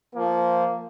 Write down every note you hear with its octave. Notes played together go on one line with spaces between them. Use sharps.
F3 A#3